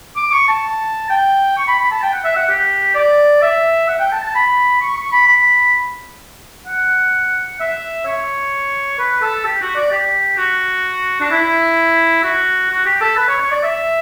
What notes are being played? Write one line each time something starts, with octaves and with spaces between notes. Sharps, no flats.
D6
C#6
A5
G5
C#6
B5
B5
A5
G5
F#5
E5
F#5
G4
D5
E5
F#5
G5
A5
A5
B5
C#6
C#6
B5
B5
F#5
E5
C#5
B4
A4
G4
F#4
D5
G4
F#4
D4
E4
F#4
F#4
G4
A4
B4
C#5
C#5
D5
E5